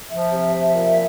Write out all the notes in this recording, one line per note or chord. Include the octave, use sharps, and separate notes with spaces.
F3 E5
C3
F3
A#2